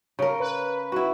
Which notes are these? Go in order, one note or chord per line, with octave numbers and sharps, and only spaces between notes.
C#3 A#4
B4
E4 F#4